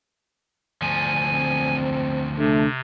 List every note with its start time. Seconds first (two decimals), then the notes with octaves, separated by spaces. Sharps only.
0.82 D2 F3 G#5
1.32 C4
2.38 C3 A3 D4